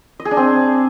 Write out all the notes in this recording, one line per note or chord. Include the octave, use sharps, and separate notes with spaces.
D#5
G#4
D4
C4